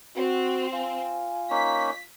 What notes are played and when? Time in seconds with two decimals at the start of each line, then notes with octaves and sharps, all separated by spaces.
0.16 C4 F#4
0.73 F4 G#5
1.50 A#3 C#4 D#4 B6